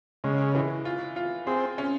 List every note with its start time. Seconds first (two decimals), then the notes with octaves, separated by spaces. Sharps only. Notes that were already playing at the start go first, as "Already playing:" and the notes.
0.24 C#3 G#3
0.55 E3
0.85 F4
1.16 F4
1.47 C4 G#4
1.78 C#4